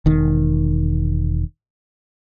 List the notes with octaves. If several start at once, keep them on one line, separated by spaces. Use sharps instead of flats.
E1 D#3